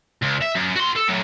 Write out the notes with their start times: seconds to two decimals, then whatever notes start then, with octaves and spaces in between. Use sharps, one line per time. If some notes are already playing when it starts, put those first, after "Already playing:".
0.22 C#2
0.41 E5
0.55 F#2
0.76 F#4 C6
0.96 A4
1.08 A2 F#3